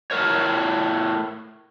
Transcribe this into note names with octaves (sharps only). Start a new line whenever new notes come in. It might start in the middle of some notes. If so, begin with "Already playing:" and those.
A2 A#4 C#5